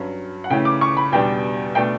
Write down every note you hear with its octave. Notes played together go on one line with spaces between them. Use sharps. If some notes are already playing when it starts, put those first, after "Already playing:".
Already playing: G2 F#3 C#4
F#5
C#3 E3 A3 C#4 G5
D6
C#6
B5
E2 B2 G3 D4 G5
B2 A3 D4 G5